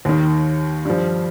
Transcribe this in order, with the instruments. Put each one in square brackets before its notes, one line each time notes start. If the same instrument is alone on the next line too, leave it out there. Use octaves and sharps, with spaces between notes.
[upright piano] D#2 D#3
G2 F3